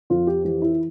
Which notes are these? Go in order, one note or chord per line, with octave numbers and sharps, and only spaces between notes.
F2 F4
G4
E3 G4
E4